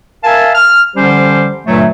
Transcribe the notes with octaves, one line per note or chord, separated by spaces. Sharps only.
A#4 E5 F5 G#5 A5
F6
D3 F3 G3 C#4 G4 C5
G2 A#2 D3 F#3 A3